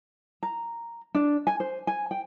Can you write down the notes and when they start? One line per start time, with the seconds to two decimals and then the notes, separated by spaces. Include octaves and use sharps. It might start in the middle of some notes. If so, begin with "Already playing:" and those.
0.43 A#5
1.15 D4
1.47 G#5
1.60 C5
1.87 G#5
2.11 G5